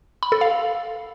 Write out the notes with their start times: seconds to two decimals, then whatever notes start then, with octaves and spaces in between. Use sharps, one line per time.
0.23 B5
0.32 A4
0.41 F5